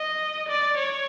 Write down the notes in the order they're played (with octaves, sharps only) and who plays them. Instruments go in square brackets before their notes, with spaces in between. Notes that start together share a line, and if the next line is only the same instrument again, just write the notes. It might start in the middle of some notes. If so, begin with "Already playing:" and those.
Already playing: [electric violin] D#5
D5
C#5